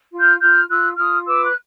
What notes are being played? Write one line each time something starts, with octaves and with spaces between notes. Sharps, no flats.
F4
F6 G6
F4 F6 G6
F4 E6 F#6
F4 D#6 F6
B4 D6 E6
F#6